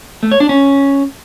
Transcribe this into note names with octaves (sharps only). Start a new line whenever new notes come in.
A3
C#5
D4
C#4